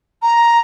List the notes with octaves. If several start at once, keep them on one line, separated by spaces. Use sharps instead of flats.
A#5